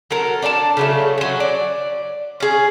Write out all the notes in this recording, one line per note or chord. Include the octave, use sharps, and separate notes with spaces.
F#3 A4 A#4
D4 D5 E5 A5
C#3 F#3 A3
F#3 C#4
D5
C#4 G#4